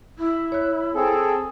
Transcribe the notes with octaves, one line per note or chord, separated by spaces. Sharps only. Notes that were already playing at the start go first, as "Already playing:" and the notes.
E4
C#5 F#6
C4 G#4 A4